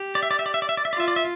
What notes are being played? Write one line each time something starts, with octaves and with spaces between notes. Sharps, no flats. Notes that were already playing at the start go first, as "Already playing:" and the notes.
Already playing: G4
D5
E5
D5
E5
D5
E5
D5
E5
D5
E5
F4 D5
E5
D5
E5